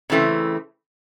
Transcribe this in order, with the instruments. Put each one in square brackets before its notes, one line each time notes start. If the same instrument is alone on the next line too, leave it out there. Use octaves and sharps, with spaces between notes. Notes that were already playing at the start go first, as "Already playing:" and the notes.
[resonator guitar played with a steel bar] C#3 E3 A3 C4